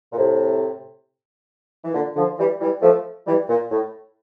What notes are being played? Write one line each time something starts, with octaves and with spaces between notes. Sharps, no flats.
A#2
A2 C3
E3
A#2 D3
D3 F3
E3 G3
E3 G3
F3 A3
E3 G3
A#2
A2